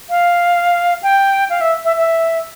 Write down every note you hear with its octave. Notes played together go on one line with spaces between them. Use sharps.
F5
G5
F5
E5
E5
E5